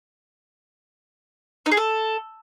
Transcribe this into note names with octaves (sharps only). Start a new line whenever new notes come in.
D#4
G#4
A4